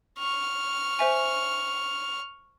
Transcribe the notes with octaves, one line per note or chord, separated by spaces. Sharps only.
C#6 F6
C5 E5 G#5